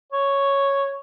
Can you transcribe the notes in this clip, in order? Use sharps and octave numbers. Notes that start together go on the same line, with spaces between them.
C#5